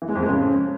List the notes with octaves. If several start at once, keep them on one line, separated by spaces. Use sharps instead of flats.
E3
G#3
F2
G#3
C#3